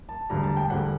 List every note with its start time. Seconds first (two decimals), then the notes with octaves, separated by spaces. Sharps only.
0.09 A5
0.30 E1 D2 D3 G3 A#5
0.43 A5
0.57 G5
0.70 E1 D2 D3 G3 F#5